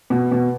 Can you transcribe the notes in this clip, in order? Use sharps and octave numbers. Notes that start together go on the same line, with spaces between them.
B2
B2